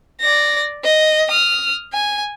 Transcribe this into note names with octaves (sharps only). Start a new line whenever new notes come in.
D5 A#6
D#5
D#6 F6
G#5